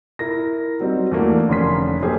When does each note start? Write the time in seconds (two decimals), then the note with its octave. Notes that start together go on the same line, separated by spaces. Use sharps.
0.19 E4 A#4 A#6
0.80 F#3 G3 C4 D#4
1.11 E2 A3 A#3 D4
1.49 F1 D3 C#4 C6 B6
2.02 B1 A#3 G4 G#4 C5